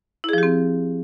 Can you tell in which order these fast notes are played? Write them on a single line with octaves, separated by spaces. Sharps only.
E4 G#4 F3 G4 C4